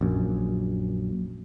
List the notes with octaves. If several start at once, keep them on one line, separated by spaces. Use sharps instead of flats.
A#1 F#2